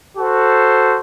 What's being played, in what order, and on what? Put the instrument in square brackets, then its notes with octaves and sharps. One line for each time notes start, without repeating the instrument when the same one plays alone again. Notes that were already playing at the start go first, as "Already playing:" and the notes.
[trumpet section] F#4 A4 C5